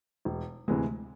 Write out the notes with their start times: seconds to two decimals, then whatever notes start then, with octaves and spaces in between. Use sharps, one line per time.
0.25 E1
0.68 D2 C3 E3 G#3